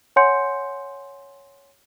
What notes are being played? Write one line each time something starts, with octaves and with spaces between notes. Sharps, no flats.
C#5 F#5 G#5 C6 G6 C#7